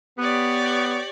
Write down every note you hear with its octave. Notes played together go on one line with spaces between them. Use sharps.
B3 G4 C#5 D5